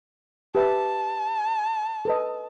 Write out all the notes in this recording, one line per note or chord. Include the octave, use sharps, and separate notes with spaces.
G4 B4 E5 A5
A4 B4 D#5